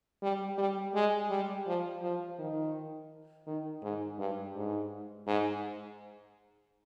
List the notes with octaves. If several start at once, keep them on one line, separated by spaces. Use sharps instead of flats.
G3
G3
G#3
G3
F3
F3
D#3
D#3
G#2
G2
G#2
G#2